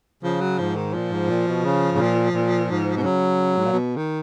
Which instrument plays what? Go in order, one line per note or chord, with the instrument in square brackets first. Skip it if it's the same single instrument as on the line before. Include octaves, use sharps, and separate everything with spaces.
[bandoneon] C#3 [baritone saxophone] F3
[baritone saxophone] F#3
[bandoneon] G#2 [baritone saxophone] F3
[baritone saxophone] D#3
[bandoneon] A#2 [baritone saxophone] F3
[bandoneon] G#2
A#2
B2
C#3
G#2
A#2
A#2
G#2
[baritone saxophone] B2
[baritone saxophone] C#3 [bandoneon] F#3
[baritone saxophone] G#2
A#2
B2
D#3